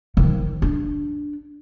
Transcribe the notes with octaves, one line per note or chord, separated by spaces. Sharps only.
D#3 F3
D4